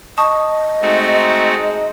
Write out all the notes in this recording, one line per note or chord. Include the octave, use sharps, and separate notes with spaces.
D#5 A5 C#6 D#6
G#3 A3 C4 D#4 F#4